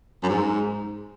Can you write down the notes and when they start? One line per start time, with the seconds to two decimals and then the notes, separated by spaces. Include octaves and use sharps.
0.23 F#2
0.29 G#2